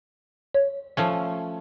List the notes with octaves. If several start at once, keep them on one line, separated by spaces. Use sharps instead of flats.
C#5
F3 A3 C#4